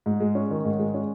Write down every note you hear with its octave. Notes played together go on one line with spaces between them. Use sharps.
G#2
G#3
C#4
D#3
G#2
G#3
C#4